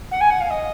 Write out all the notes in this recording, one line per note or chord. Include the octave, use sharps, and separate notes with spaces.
F#5
G#5
F#5
F5
D#5